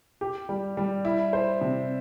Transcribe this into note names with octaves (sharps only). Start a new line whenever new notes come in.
G4
G3
G3
E4
C5
C3